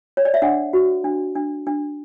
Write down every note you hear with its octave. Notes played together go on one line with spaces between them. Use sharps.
C#5
D5
E5
D4 F#5
F#4
D4
D4
D4